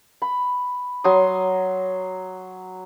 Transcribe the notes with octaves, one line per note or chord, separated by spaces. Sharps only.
B5
F#3 C6 D#6